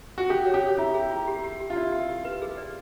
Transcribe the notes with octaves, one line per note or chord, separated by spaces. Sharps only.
F#4
G4 G#4
C#5
G4
C#5
E4 F4
G#4
F4
G4
G4
G4
F4
E4 D5
G4
G4
B4
G#4
D5